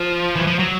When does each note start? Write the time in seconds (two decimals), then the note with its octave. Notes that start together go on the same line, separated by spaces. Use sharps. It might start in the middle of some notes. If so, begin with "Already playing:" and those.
Already playing: F3
0.35 E3
0.47 F3
0.59 F#3